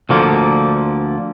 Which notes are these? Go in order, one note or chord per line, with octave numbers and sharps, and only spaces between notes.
D2 D3 F3 A#3